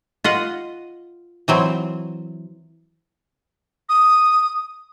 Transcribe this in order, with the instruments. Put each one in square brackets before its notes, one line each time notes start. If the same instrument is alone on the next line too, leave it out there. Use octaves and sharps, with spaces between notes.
[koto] F4 D#5 F#5
E3 F#3 C4 E4
[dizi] D#6